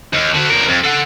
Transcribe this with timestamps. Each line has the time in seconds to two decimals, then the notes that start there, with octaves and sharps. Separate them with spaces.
0.13 D#2
0.34 D3 F#4
0.50 E2 A#4
0.68 F2
0.84 A4 F#5